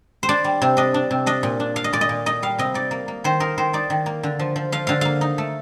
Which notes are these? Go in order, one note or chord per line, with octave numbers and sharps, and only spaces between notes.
C5
D4 D5
G3
C3
D4 D#5
D4
C3
D4 D#5
A#2
D4
D4 F5
D#5
A#2 D5
D#5
A#2
D#4 D#5
G3 F5
C3 D#5
D#4 D5
A#3
A#3
D#3 C5
D#4 A#4
D#3 C5
D#4 D5
D#3
A#3
D3
F3
F3
F3 F5
D3 F5
A#3 F5
D#4
A3